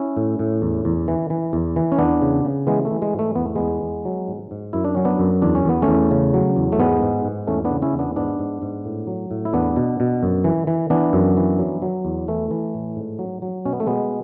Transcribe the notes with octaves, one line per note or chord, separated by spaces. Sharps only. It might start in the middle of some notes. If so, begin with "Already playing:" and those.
Already playing: C#4 E4
A2
A2
E2
E2
E3
E3
E2
E3
C#4
E2 B3 D4
C#3
C#3
E3 G#3 B3
A3
E3
G#3
G#2
A3
E2 B3
A3
E2 G#3 B3
E2
F#3
G#2
G#2
F#2 E4
D4
F#3 C#4
B3 D4
F#2
E2 D4
C#4
E2 B3
A3 C#4
E2
C#3
F#3
E2
A3
G#2 G#3 B3
G#2
G#2
E2 A3 C#4
B3 D4
C#3
C#4 E4
E2
B3 D4
G#2 B3 D4
G#2
G#2
A2
F#3
A2
E4
E2 B3 D4
B2
B2
F#2
E3
E3
E3 B3 D4
F#2
E3
F#3
F#3
E2
E3 A3
E3
A2
G#2
F#3
F#3
B2 C#4
B3
A3
B2 G#3 B3